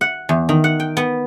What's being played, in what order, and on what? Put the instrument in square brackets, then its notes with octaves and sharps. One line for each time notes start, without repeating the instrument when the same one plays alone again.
[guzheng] F#5
E2
D#3
F#5
G5
B3